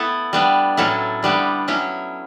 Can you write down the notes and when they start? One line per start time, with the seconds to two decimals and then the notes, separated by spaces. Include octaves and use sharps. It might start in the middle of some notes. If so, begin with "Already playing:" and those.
Already playing: A3 B3 E4 A4
0.33 G3 B3 D4
0.77 A2 F#3 C#4 E4 A4
1.23 D3 G3 B3 D4 G4
1.68 F#3 C#4 E4